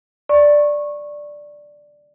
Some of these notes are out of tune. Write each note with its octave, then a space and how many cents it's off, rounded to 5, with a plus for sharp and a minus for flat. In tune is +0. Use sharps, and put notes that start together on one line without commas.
D5 +0 C#6 -20